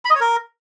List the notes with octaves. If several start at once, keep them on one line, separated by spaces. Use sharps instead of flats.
B5
D#5
C#5
A#4